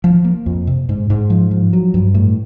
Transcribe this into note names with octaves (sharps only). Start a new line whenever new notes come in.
F3
A#3
F2
C3
G#2
G#2
F3
F3
F#3
G2
A2